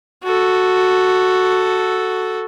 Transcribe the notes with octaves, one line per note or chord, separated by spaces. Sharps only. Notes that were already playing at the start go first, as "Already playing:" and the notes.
F#4 A4